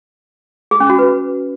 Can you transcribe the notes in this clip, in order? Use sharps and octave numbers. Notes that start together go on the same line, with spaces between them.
G#4
C#4
F#4
B4